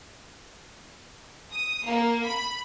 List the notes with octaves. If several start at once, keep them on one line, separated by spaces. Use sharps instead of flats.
D#6
A#3
B5